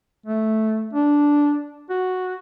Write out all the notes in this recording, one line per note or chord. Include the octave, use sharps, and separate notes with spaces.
A3
D4
F#4